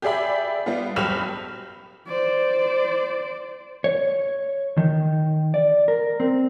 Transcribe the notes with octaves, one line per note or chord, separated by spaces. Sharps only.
G4 G#4 D5 E5 B5
G3 B3 F4
F#1 G4 B5 F6 E7 F7
C5 D5
C#5
D#3
D5
A#4
C4